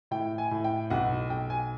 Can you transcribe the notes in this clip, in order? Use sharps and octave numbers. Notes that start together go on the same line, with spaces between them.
A2 G5
G#5
A2
G5
B1 F#5
B1 G5
G#5